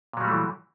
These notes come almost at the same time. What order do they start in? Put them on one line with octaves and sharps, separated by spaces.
A#2 F#3 G3 A3 E3